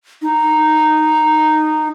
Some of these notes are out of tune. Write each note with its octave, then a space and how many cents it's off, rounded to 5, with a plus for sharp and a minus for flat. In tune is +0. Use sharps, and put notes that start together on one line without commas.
D#4 -10